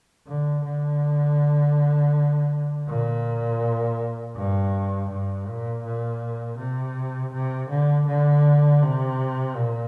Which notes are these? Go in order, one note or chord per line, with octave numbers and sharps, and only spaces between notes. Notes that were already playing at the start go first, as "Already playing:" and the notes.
D3
D3
A#2
G2
G2
A#2
A#2
C3
C3
D3
D3
C3
A#2